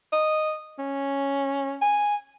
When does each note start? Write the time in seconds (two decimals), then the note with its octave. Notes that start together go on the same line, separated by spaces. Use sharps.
0.13 D#5
0.79 C#4
1.82 G#5